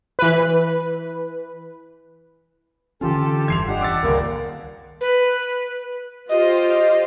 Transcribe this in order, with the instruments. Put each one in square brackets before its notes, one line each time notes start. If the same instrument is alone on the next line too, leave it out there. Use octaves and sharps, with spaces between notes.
[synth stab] E3 B4
[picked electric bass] D3 E3 C#4 [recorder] F4 [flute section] G4 A4 G5
[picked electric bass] F1 G2 E3 [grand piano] G#6 C7 F7
[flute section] D4 G4 D#5 [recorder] F#5
[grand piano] D6 E6 A6
[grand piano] D#1 A#3 A#4 [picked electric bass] C#2 [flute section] D5 G5 C6
[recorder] B4
[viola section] F4 G4 C5 [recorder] D#5